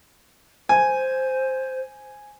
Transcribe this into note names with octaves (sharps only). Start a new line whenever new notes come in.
C5 G#5